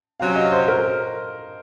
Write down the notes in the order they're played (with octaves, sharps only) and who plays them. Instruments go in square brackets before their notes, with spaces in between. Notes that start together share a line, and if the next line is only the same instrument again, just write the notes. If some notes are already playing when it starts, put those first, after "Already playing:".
[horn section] C3 F#3 C#4 [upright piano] F5
[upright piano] D#5
C5
A#4